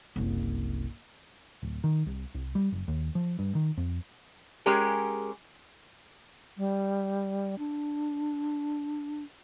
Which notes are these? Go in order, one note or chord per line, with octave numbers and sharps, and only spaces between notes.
F#1 C2
D1
D#3
C2
C2
G3
F#1
D#2
F3
G2
D#3
F2
G#3 C#4 G4 G#4 A#4
G3
D4